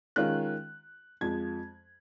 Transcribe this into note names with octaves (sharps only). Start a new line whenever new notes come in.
D#3 G#3 C#4 F4 F#6
F2 F3 G#3 G#6